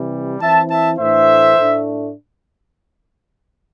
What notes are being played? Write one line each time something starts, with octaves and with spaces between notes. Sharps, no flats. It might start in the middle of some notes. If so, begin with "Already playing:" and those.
Already playing: C3 E3 G3
E3 C4 E4 E5 A5
E5 A5
A2 E3 A3 D4 C5 E5
A2 A3 D4